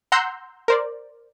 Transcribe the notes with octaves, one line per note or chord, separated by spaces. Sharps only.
F#5 A#5 C6 E6 G6
A#4 C5 D5